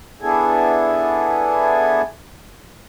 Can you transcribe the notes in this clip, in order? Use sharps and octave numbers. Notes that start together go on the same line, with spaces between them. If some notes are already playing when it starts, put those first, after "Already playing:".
B3 D4 E4 G#4 A4 G#5